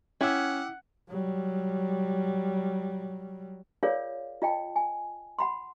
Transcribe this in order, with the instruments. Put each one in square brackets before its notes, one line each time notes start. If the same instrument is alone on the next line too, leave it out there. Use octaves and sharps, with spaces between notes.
[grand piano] C#4 [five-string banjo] E4 [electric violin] F#5 [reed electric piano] G5 D6 E6
[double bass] F#3 G3
[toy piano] F4 G#4 A#4 C#5 D5 F5
F4 D#5 G5 A5
G#5
F#5 B5 C6